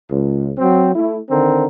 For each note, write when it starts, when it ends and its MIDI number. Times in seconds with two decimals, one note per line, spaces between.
0.10 0.52 37
0.58 0.93 54
0.58 0.93 60
0.95 1.18 57
0.95 1.18 64
1.29 1.66 50
1.29 1.66 51
1.29 1.66 60
1.29 1.66 70